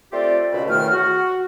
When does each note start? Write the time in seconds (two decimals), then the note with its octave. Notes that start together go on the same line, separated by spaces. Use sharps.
0.11 A3 C4 F4 G4 D5
0.52 C#2 B2 B5
0.68 E2 A2 D#3 A3 F6
0.90 F#4